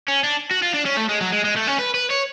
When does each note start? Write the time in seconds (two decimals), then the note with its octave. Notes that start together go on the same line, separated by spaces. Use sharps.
0.08 C#4
0.24 D4
0.51 F#4
0.63 F4
0.74 D4
0.86 C#4
0.97 A3
1.09 G#3
1.21 F#3
1.32 G#3
1.44 G#3
1.56 A3
1.67 C#4
1.78 B4
1.94 B4
2.11 C#5